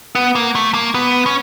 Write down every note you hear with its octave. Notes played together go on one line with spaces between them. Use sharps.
B3
A#3
A3
A#3
B3
C#4